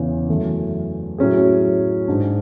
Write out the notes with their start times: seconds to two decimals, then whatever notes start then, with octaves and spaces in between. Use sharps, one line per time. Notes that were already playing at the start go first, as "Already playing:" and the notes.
Already playing: E2 C#3 E3 B3
0.29 F#2 E3 A3
1.18 A2 F#3 C#4 G#4
2.08 G#2 G#3 D4